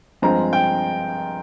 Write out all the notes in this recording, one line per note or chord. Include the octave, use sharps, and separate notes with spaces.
G2 F3 G#3 C4 A#5
G5